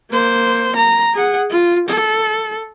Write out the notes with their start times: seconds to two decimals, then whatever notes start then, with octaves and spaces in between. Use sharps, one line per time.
0.11 A#3 C5
0.76 A#5
1.13 G#4 F#5
1.50 F4
1.89 A4